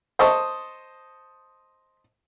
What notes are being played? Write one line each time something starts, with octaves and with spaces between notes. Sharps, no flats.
C5 D#5 A5 C#6 D#6